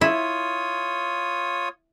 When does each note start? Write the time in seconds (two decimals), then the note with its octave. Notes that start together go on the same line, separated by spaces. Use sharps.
0.01 E4 F4 C#5 D#6